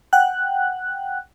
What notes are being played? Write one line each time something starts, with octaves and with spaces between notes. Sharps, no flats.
F#5 G5 F#6